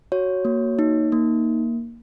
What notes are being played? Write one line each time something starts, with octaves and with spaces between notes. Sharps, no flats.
F#4 C#5
A#3
D#4
A#3